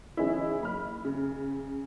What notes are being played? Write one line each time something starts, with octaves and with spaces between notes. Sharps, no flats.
E3 G#3 C#4 D#4 E4
F#1 B5 F6
C#3